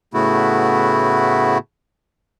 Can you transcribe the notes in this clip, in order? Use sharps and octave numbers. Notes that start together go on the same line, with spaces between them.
A2 C#3 A3 B3 E4 F#4